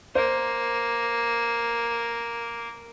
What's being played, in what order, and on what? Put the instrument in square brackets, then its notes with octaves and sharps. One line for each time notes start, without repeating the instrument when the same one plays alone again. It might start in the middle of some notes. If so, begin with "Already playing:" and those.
[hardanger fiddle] A#3 [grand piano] C5